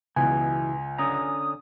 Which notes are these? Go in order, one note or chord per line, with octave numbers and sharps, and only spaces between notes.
C#2 B2 E3 B3 G#5
D3 C#4 A#5 D#6